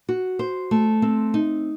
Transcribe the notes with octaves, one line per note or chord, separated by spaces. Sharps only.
F#4
C5
A3
C4
D#4